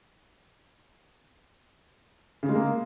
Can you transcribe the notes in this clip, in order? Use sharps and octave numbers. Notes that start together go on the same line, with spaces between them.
C#3
G#3
A#3